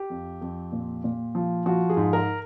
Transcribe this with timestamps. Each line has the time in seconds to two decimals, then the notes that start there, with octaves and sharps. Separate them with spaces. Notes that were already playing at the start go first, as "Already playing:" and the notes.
Already playing: G4
0.10 F2
0.41 F2
0.72 A#2
1.04 A#2
1.35 F3
1.66 F3 F#4
1.90 G#4
1.97 G#2
2.13 A#4